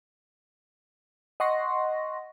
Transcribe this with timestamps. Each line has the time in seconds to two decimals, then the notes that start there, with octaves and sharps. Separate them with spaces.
1.40 D#5 F#5 C6 C#6 A#6